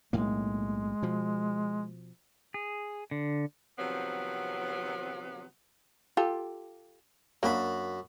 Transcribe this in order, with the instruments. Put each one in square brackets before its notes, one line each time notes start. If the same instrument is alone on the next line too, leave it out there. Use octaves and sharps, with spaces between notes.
[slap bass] B1 A2 A#3 [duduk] G#3
[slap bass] B2 F3
[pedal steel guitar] G#4
D3
[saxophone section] C3 D#3 F3 F#3 B3 C4
[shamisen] F4 G4 A4
[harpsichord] F#2 F#4 B5 [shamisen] A#3 D4